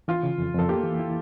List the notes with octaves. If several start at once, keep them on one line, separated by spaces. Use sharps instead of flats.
E3 F4
C#3
F2
F2 A4
A#3 G4
E3
E4